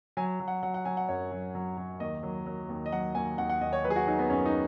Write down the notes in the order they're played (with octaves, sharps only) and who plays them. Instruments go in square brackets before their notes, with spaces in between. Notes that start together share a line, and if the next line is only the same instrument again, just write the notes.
[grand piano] F#3 G#5
F#3
F#5
F#3 F#5
F#5
F#3 G#5
F#5
F#2 C#5
F#3
F#3
F#3
D#2 D#5
F#3
F#3
D#2
D#5
F#3 F#5
D#2 G#5
D#2 F#5
F#5
D#2 D#5
C#5
F#3 B4
G#4
F#4
F#3 D#4
B3
F#2 C#4
D#4